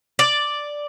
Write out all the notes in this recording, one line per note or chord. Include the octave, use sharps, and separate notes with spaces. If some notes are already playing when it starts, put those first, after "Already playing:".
D5